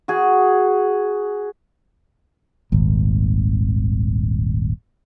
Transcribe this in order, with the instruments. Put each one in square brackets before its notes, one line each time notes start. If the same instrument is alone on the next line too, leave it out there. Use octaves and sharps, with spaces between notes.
[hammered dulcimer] F#4 G#4
[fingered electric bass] D#1 G#1